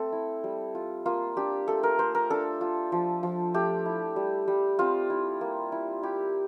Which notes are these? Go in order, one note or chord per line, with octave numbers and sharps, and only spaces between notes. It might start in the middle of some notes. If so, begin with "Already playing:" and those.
Already playing: A3 C4 A4
E4
G3
F4
A#3 F4
D4 G4
A3 A4
A#4
A3 C5
A#4
D4 A4
F4
F3
F3
A3 G4
E4
G3
G3
C4 F4
E4
A#3
E4
E4 G4